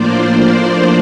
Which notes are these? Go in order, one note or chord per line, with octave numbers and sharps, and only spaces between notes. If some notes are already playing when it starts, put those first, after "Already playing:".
Already playing: A2 F3 A#3 D4 F4 C5 D5
C5 D5